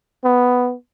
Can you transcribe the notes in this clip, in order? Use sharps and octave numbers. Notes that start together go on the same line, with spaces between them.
B3